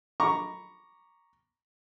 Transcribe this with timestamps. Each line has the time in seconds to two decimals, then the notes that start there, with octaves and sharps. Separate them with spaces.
0.20 A#5 B5 C#6 D6